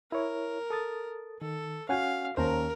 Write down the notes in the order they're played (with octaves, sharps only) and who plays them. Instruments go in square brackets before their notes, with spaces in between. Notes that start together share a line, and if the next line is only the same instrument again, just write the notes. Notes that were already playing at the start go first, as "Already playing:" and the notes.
[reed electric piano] E4 C#5 [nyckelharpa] A#4
[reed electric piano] A4 D#6 A6
[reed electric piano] D#3 [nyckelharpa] A4
[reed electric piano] C#4 F#5 G#5 [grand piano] F#4 [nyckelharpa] F5
[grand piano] D#2 C#4 A5 [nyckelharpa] A#4 [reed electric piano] C5 A#5